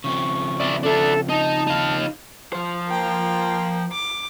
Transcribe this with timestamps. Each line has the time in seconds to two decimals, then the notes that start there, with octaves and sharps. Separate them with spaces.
0.04 C#3 F3 C4 C#6
0.60 E4 D5
0.84 D4 A4 E5
1.30 D#4 A5
1.67 D#4 F5
2.53 F3 C5
2.88 A#3 G5
3.92 D6